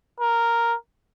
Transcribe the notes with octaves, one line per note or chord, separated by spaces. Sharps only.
A#4